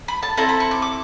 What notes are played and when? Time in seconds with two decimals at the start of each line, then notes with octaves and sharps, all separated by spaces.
0.08 B5
0.23 A5
0.37 C4 E4 A4 A#5
0.49 B5
0.60 C#6
0.71 D6
0.82 D6